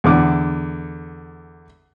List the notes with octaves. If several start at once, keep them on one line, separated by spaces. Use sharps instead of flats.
E2 D3 D6